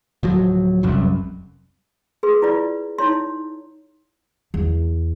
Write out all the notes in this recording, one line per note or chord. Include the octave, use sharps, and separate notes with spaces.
D1 F3 F#3
F1 C2 F#2
G#4 B4 C6
E4 F4 B4 D5
D#4 E4 C#5 C6
E2